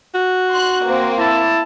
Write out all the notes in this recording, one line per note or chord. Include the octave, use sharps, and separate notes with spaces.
F#4
C6 F#6
A#3 C4
E4 A5